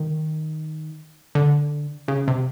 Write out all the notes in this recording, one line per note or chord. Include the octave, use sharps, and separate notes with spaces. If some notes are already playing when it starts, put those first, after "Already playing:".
Already playing: D#3
D3
C#3
C3